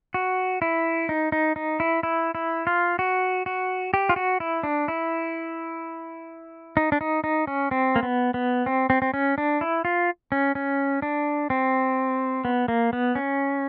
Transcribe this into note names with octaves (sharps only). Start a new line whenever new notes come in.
F#4
E4
D#4
D#4
D#4
E4
E4
E4
F4
F#4
F#4
G4
F4
F#4
E4
D4
E4
D#4
D4
D#4
D#4
C#4
C4
A#3
B3
B3
C4
C4
C4
C#4
D4
E4
F4
C#4
C#4
D4
C4
B3
A#3
B3
C#4